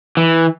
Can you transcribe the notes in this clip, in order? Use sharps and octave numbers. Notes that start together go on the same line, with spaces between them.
E3